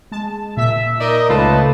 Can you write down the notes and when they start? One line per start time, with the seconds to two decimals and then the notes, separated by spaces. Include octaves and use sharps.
0.12 G#3 A5
0.57 A#2 E5 B6
1.00 D#4 A#4 D5 D#5
1.29 C#2 A3 F4 B4 A5